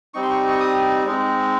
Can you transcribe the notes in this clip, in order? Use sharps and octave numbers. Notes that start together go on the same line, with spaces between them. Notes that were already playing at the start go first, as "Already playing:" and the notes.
G3 C4 D#4 C#6
C6
C#6
C#6
D#6
G#3 C4 D#4